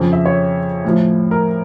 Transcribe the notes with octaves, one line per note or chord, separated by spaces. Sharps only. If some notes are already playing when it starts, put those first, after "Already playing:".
Already playing: F2 C#3 F3
E5
C#5
A2 F3
A#4